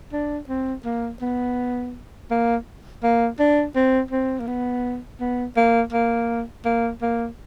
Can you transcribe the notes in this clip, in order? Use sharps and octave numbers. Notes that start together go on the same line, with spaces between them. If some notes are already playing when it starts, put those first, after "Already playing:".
D4
C4
A#3
B3
A#3
A#3
D4
C4
C4
A#3
B3
B3
A#3
A#3
A#3
A#3